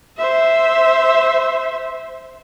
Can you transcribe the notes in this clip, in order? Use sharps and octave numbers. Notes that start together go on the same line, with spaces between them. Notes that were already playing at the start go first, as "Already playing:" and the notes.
C5 E5